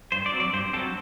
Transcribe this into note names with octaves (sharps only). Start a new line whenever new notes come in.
G2 C5
D5
F#3 C4
D5
G2 C5
F#3 C4 A4